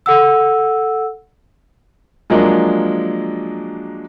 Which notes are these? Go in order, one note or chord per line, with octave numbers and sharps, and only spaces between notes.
A4 F#5 E6
F3 F#3 G#3 A#3 D4